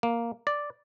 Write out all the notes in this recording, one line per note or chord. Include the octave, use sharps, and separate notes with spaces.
A#3
D5